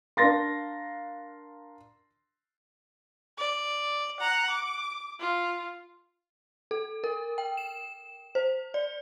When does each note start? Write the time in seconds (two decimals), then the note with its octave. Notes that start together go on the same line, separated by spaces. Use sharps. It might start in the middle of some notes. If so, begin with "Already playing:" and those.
0.17 D4 A#4 F5 C6 A6 A#6
3.38 D5
4.20 F#5 A#5
4.50 D6
5.20 F4
6.71 A4
7.04 A#4
7.38 G5
7.57 E7
8.35 C5
8.74 D5